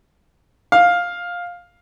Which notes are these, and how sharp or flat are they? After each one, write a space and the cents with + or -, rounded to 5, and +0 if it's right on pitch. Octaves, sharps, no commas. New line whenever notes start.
F5 +10